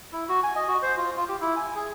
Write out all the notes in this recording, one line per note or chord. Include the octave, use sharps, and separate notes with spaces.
E4
F#4
G#5
D#5
F#4
C5
F4
F4
G4
E4
G#5
G#4